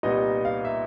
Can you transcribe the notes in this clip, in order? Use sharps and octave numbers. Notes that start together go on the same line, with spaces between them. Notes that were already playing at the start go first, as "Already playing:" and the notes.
C2 A#2 G3 B3 D#4 D#5
F5
E5